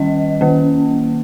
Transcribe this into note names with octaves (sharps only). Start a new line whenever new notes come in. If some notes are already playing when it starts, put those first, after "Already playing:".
Already playing: D#3 G3 C#4 D#5
D#3 A#3 C#4